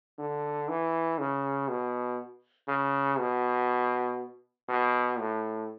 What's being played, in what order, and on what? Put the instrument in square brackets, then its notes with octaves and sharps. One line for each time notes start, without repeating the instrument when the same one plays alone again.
[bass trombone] D3
E3
C#3
B2
C#3
B2
B2
A2